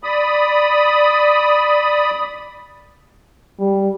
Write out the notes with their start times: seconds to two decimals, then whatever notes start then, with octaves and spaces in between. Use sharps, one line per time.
0.03 D5 B5 D#6
3.59 G3